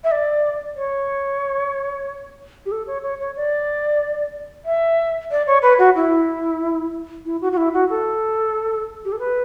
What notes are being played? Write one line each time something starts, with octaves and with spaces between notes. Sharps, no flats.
E5
D5
C#5
G4
A4
C#5
C#5
C#5
D5
E5
D5
C#5
B4
F#4
E4
E4
F#4
F#4
E4
F#4
A4
G4
A4
B4